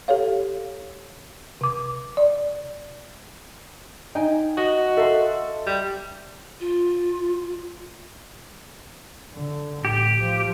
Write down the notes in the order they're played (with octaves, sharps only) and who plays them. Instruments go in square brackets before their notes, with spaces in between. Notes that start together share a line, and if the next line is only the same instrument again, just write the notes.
[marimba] G4 A4 C#5 F5
C3 D6
D5
[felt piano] D#4 [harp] G5 G#5
[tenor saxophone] F#4 [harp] D#5
[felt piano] A4 [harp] E5 F5 C6
[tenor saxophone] G3
[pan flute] F4
[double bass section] D3
[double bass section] A1 [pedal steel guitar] G4
[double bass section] F3